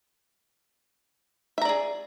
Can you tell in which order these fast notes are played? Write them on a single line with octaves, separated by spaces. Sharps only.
E5 A#5 D5 G#4